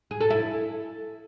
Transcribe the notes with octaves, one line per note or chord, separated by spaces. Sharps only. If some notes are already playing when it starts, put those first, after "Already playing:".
G#4
A4
E4